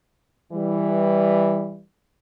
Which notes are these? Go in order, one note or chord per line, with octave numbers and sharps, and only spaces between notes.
E3 G3